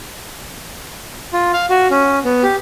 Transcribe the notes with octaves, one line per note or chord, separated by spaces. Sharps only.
F4
F5
F#4
C#4
B3
G4